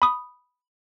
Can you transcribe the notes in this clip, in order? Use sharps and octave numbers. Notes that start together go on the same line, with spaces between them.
B5 D#6